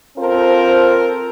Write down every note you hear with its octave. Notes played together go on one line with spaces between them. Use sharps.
C4 F4 A4 A#4 C5